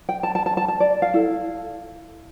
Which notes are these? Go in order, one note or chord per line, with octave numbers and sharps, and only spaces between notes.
G5
A5
A5
A5
A5
A5
D5
F5
E4 A4